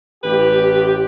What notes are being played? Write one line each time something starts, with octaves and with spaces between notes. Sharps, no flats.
A1 G4 B4